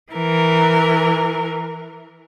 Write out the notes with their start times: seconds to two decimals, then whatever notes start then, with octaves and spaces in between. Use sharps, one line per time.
0.13 E3 A#4